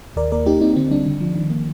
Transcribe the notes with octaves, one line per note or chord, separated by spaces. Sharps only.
D#2 A#4 D5
A#3 A#4 D5
A#3 D#4 G4
A#3 C4 D#4
D3 C4
G3 D4
D3
F3
D#3
A#3